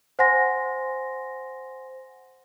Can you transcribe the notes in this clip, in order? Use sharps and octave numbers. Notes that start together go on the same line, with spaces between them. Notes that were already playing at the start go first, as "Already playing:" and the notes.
C5 F#5 G#5 C6 A#6